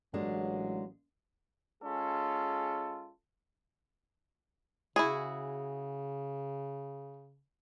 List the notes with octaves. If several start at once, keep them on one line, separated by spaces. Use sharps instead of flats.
A1 F#3 G#3 A#3 D4
G#3 C#4 F4 G#4 A4
C#3 E4 F#4 G#4